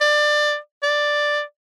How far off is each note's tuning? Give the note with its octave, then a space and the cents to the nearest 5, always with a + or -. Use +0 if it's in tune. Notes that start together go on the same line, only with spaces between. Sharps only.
D5 +20
D5 +5